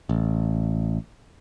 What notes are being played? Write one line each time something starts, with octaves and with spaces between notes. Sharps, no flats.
A1